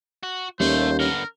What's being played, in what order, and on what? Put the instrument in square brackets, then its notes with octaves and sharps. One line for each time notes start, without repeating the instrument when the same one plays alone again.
[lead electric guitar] F#4
[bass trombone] D#2 [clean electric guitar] G3 C#4 [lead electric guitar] A3 [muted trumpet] C5
[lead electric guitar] D3 B3 [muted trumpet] A#4